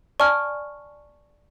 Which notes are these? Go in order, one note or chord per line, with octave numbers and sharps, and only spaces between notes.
D5 G#5 A5 C#6 F6